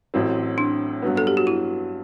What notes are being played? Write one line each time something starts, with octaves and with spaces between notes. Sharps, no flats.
A1 A2 F#3 C4
D4
G2 F#3 B3
A4
G4
F#4
E4